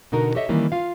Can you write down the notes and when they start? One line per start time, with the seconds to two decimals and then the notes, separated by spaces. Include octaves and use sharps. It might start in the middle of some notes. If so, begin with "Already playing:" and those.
0.12 B2 D3 D#4 F#4 A#4
0.35 G4 A4 C#5 D#5 E5
0.49 D#3 E3 G3 A#3 C#4
0.72 F4 F5